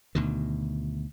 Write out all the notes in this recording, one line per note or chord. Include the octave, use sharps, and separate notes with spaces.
D2 B2 D#3